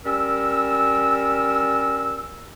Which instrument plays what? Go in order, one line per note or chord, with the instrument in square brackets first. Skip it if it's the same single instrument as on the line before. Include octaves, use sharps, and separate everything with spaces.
[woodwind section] G3 C#4 A#4 E6